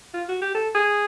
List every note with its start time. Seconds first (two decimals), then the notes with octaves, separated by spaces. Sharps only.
0.14 F4
0.28 F#4
0.42 G4
0.54 A4
0.75 G#4